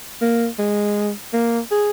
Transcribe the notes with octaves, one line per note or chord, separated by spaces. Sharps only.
A#3
G#3
A#3
G#4